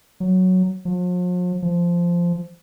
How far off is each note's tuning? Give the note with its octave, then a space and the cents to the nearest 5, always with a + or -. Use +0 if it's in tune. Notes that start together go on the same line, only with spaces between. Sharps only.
F#3 +0
F3 +45
F3 -10